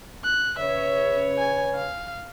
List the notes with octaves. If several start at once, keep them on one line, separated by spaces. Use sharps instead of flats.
F#6
C#3 B4 C#5 E5
G#5
F5